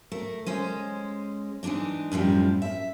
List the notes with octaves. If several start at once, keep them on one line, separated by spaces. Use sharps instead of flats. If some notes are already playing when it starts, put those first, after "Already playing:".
A3 A#4
G#3 C#4 C5
E3 G#3 A#3 D4 D#4
F#2 A2 F3 G3
E5